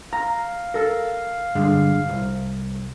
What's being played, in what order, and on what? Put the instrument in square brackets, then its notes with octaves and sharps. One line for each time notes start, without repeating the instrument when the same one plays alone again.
[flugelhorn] F5 [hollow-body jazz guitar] A#5
[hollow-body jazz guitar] A4 A#4
G2 D3 G#3
C2